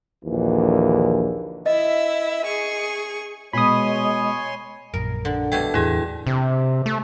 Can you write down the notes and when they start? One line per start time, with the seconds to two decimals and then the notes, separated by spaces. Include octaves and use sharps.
0.24 A#1 D#2 D3 E3
1.66 E4 D#5 E5
2.45 G#4 C#6
3.53 B2 G#3 C#5 G#5 B5 C6 D#6
4.94 A#1 F#2 A#4
5.25 D3
5.52 B2 G3 A3 G5 G#6
5.74 E2 A2 E4 G#4
6.27 C3
6.86 A3